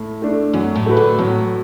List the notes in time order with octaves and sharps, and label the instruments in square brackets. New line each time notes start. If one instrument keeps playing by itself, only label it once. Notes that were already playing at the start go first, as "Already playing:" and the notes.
Already playing: [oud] A2
[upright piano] A3 D4
[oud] F#2 [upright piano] F#3
[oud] A2
[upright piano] A3 F#4 B4
[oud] D3
[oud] A2 [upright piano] F#3